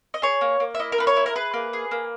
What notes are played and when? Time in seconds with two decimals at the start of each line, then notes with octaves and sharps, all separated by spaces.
0.14 D#5
0.22 G#4 C#5
0.41 A#3
0.60 A#3
0.75 E5
0.79 E4 D#5
0.92 A#4
0.98 A#3 B4
1.07 C#5
1.17 E4
1.26 A#4
1.35 G#4 B4
1.54 A#3
1.73 G#4
1.91 A#3